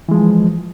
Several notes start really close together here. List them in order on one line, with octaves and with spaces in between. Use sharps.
E3 G#3 F3